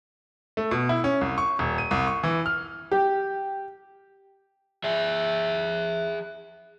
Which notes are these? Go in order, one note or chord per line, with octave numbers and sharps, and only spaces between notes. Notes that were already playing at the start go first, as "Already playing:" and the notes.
A3
B2
E4
C#4
C2
C#6
D#1
D#7
C2
C#6
E3
F6
G4
G#4 E5